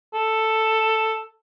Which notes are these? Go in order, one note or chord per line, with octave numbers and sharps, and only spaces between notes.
A4